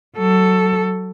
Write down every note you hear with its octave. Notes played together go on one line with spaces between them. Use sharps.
F#3 A4